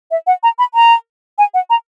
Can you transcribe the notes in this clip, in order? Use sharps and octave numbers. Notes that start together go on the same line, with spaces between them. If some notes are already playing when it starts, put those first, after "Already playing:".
E5
F#5
A#5
B5
A#5
G#5
F#5
A#5